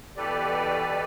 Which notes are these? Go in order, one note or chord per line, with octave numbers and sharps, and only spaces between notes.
B2 E3 G4 A4 B4 D5